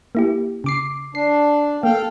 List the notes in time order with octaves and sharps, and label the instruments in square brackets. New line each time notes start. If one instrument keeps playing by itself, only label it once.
[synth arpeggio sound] A#3 E4 G4
C#3 D6 C7
[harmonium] D4 [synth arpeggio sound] C7
[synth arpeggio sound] A#3 [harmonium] A4 F5 G5